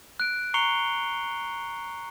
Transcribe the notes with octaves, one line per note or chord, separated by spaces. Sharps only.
F#6 D7
A#5 C#6 C7 C#7 F7 G7